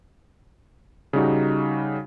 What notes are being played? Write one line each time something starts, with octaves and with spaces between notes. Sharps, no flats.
C#3 G3 D#4 F#4